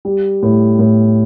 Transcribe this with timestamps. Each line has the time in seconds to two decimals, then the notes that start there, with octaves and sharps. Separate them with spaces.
0.05 G3
0.43 A2
0.79 A2